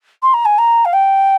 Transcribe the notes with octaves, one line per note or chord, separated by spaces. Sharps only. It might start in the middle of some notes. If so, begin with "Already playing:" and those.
C6
A#5
G#5
A#5
F5
G5